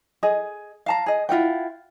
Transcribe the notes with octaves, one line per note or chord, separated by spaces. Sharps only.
G#4 D#5
F5 A5 A#5
G#4 D#5
E4 F4 F#5 G5